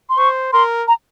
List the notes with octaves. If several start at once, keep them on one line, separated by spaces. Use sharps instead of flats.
C6
C5 C#6
A#4 C6
A#5